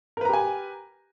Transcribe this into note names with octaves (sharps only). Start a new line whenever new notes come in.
G4 A#4 B4 G#5 A#5